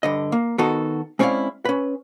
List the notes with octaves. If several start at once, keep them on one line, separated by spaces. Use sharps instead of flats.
G2 D3 D#5
A#3
D#3 B3 D#4 F#4 A4
G#3 C4 C#4 E4 D5 F5
C#4 B4